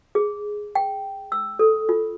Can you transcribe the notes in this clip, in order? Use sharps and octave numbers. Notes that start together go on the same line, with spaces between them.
G#4
G5
E6
A4
F4